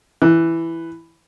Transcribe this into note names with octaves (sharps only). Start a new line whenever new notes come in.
E3